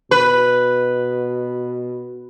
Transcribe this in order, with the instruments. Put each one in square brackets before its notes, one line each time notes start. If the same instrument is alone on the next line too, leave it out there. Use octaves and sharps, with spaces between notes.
[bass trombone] B2 [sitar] B4